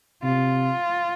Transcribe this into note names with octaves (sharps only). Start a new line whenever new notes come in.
C3 F4